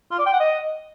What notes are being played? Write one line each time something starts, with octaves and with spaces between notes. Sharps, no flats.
F4
D5
G5
F#5
D#5